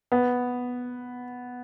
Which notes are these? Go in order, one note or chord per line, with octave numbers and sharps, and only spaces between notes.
B3